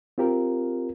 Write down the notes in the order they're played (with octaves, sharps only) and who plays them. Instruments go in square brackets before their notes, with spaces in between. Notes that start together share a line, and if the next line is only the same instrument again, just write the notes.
[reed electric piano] C4 F4 G4 A#4